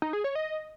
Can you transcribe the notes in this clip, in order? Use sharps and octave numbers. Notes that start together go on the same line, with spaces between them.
D#4
G#4
C#5
D#5